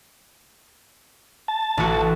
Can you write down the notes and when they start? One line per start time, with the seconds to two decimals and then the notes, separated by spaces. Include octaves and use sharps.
1.48 A5
1.77 A1 F#4